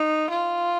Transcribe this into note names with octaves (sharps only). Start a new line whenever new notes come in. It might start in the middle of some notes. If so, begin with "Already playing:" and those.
Already playing: D#4
F4